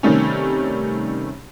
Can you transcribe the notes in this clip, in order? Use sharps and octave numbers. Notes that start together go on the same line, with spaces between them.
C3 D#3 G3 A3 C#4